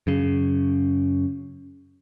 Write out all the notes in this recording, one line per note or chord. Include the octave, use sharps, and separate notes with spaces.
F#2 C#3